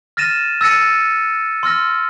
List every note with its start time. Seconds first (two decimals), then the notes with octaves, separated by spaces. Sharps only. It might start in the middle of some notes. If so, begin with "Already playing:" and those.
0.17 F6 A6 A#6 D#7 E7
0.61 E6 A6 A#6 C#7 D#7
1.63 C6 E6 F6 A#6